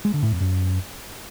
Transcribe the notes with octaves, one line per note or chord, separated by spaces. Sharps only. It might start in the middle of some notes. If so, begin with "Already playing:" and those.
G#3
D3
A2
F2
F#2